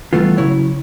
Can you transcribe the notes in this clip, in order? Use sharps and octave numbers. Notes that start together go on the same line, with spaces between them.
E3 G3 A3 B3 F4
C#3 F#3 E4 C#5